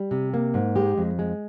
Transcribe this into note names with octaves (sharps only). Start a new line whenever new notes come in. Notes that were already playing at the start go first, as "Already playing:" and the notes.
Already playing: G3
C3
A#3
G#2
G#3 G4
F2
G#3